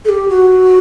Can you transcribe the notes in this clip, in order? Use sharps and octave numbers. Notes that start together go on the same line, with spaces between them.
A4
G4
F#4